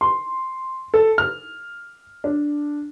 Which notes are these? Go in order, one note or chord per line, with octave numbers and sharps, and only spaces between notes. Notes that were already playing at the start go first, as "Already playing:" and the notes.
C6
A4
F6
D4